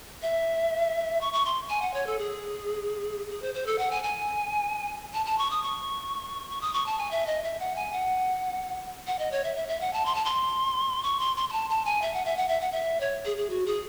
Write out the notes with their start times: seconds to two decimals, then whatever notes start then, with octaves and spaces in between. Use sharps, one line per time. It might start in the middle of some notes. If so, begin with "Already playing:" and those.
0.22 E5
1.21 C#6
1.33 C#6
1.45 C6
1.70 G#5
1.82 F#5
1.94 C#5
2.07 A4
2.19 G#4
3.30 G#4
3.42 C5
3.54 C5
3.66 A4
3.78 F#5
3.91 G#5
4.04 G#5
5.14 A5
5.26 A5
5.38 C#6
5.51 D#6
5.63 C#6
6.50 C#6
6.61 D#6
6.73 C#6
6.86 A5
6.98 G#5
7.11 E5
7.27 D#5
7.43 E5
7.60 F#5
7.76 G#5
7.92 F#5
9.07 F#5
9.19 D#5
9.32 C#5
9.44 E5
9.56 E5
9.68 E5
9.81 F#5
9.93 A5
10.06 C6
10.15 A5
10.25 C6
11.03 C#6
11.20 C6
11.36 C6
11.49 C6
11.52 A5
11.70 A5
11.85 G#5
12.02 E5
12.14 F#5
12.25 E5
12.37 F#5
12.49 E5
12.61 F#5
12.72 E5
13.01 C#5
13.25 G#4
13.38 G#4
13.50 F#4
13.66 G#4